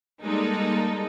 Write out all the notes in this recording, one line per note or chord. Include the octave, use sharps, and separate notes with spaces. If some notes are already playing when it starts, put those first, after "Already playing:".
G3 G#3 A#3 D#4 A4